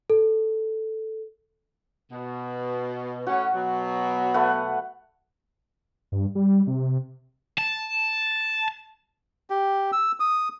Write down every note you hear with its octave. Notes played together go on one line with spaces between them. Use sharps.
A4
B2
A2 C#4 F#4
B2 F#3
A3 B4 F#5
G2
G3
C3
A5
G4
E6
D#6